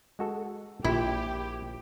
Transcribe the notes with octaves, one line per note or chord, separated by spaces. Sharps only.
G#3 F#4 A4
A#1 A#2 E4 G4